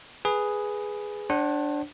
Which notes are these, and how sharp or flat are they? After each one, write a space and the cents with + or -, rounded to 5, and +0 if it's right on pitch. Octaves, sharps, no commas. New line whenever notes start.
G#4 +0 B4 +0
D4 +0 C5 +45 F#5 +35